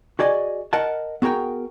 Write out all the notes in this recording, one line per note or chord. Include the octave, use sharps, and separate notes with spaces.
F#4 G#4 D5 D#5 G#5
A#4 D#5 F#5 A5
B3 F#4 G#4 A#4 G5